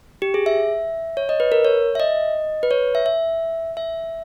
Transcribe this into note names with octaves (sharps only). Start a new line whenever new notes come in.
G4
G#4
E5
C#5
D#5
B4
A#4
C#5
E5
D#5
B4
C#5
E5
E5
E5